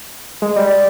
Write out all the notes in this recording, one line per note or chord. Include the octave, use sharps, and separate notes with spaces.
G#3
G3